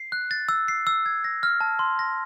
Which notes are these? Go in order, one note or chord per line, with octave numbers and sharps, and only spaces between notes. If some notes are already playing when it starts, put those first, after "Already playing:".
Already playing: C7
F#6
A6
E6
C7
E6
G#6
A#6
F6
A5
C6
A#6